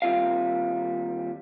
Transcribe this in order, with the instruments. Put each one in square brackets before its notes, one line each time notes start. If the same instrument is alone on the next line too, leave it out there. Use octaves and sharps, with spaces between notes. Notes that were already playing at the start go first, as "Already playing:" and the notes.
[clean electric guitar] D#2 G3 C4 F4 E5 F5